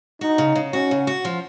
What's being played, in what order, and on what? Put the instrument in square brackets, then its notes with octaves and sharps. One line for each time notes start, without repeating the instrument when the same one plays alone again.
[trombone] D#4 [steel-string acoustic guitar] F#4
[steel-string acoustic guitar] C#3
C#3
[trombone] C#4 [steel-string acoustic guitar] F#4
[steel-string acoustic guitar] C#3
F#4
F3